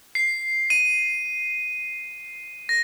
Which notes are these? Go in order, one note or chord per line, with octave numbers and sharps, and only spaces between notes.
C7
D#7
A#6